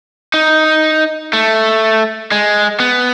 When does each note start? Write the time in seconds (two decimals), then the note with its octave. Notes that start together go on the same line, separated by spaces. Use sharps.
0.34 D#4
1.33 A3
2.32 G#3
2.80 B3